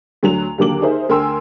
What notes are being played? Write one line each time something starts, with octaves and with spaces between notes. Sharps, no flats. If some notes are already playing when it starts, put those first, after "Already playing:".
D2 F#3 F7
D#2 D3 F#3 A#3 D6 F#7
D#4 G#4 A#4 C5 E5
D2 A#4 G5 G#5 C6 E6